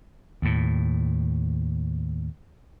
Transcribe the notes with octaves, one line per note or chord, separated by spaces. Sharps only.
D#2 A2